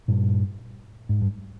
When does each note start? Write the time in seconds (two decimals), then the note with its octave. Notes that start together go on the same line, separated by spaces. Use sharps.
0.08 G2 A#2
1.09 G#2
1.21 G2